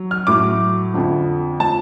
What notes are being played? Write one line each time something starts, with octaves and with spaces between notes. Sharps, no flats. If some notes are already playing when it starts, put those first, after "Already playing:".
Already playing: F#3
F6
A2 F#3 D6
F2 D3 F3
F3 A5